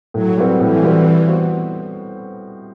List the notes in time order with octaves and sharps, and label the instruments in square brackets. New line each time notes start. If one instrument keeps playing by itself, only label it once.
[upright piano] A2 [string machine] F#3
[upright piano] G3 C4 F#4 B4
[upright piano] A2 [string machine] E3
[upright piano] G3 C4 F#4 B4
G3
B3 F#4 C5